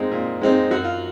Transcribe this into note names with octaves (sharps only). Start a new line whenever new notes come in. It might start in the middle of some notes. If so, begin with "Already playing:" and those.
Already playing: A#2 G#3 C4 D#4
A#2
G#3 C4 D#4
F#2 F#4
F4